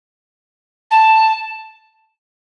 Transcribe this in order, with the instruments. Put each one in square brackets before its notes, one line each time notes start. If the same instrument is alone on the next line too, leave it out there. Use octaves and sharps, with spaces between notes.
[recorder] A5